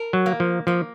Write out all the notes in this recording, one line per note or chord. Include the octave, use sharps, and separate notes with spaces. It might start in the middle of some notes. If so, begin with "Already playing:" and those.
Already playing: A#4
F#3
A#3
F3
F3 A#3